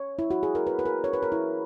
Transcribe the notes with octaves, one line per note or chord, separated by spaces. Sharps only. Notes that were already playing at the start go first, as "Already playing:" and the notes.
Already playing: C#5
E4
F#4
G#4
A#4
B4
B4
A#4
C#5
B4
A#4
E4